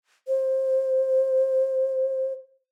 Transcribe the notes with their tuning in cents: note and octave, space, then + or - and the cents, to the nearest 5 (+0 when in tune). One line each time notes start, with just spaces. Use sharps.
C5 +15